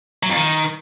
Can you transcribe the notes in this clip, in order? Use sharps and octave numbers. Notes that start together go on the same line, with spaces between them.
F#3
F2
D#3